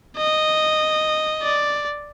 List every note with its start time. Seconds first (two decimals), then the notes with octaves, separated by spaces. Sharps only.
0.17 D#5
1.43 D5